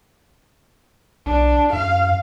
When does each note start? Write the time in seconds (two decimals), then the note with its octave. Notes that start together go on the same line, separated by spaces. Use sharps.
1.26 B1 D4
1.73 F#2 F5